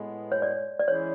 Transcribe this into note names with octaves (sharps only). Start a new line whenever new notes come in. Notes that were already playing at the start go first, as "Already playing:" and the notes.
Already playing: A2 G#3 B3
C#5
D5
D5
E3 G#3 C#4 E4 G#4 C#5